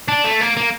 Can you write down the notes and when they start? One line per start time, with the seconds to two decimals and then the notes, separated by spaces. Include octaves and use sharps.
0.08 D4
0.24 A3
0.41 A#3
0.57 A#3